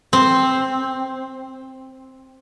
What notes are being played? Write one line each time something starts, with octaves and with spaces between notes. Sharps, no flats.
C4